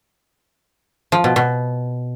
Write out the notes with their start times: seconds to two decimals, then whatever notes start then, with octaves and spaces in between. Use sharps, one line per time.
1.12 F3
1.24 B2
1.36 B2